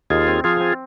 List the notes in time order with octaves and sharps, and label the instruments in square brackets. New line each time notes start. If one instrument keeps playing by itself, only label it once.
[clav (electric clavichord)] D#2 [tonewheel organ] F4 G#4
[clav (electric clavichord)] C4
[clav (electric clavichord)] F3 [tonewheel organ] F4 G#4
[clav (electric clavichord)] C4